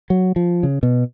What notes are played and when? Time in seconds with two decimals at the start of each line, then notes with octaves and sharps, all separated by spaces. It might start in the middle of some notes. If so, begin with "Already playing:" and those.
0.10 F#3
0.36 F3
0.63 C#3
0.83 B2